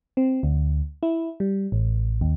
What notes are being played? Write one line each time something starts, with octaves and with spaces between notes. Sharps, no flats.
C4
D2
E4
G3
A1
D#2